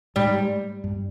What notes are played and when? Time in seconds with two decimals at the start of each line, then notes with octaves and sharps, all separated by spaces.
0.16 G#2 G3
0.84 G2